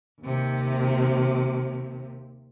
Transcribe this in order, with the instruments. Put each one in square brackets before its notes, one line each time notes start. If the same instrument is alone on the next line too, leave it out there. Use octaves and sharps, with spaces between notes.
[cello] D#2 C3